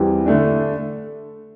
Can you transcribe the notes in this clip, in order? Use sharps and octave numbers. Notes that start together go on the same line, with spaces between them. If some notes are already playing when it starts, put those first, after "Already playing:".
Already playing: E2 E3 G3 C4 G4
D3 A3 D4